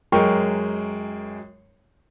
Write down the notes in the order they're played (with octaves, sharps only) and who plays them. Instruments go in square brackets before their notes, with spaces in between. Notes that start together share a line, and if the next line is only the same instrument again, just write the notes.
[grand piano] F#2 G#3 A#4 G5 C#6